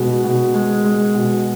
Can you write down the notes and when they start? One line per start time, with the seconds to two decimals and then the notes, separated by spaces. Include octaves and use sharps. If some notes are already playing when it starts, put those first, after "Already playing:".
Already playing: B2 G#3
0.24 B2
0.54 G#3
0.85 G#3
1.14 B2